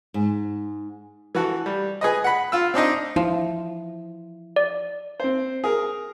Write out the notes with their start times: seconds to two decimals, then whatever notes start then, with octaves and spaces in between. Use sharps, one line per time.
0.14 G#2
1.35 E3 F#4 A4
1.66 G3
2.01 G#4 B4 D#5
2.24 F#5 B5
2.52 F4 E6
2.74 C4 D4 D#4 D#5
3.16 F3 E4
4.56 D5
5.20 C4 C5
5.64 G#4 A#4